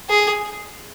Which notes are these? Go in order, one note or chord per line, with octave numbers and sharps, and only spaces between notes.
G#4